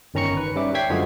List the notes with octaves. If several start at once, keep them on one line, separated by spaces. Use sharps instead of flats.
G1 D#3 C#4 A#5 C#6 C#7
B4
G3 C#4 E5 D6
C#5 E5 G5 G#6 B6 C7
F#2 D3 F3 G#3 F#4 G#4